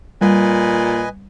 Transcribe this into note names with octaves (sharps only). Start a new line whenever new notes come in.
A#2 G3 B4 D#5 G#5